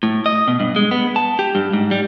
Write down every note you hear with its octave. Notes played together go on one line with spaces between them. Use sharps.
A2
D#5
B2
G2
G#3
B3
A5
G4
G2
G#2
G3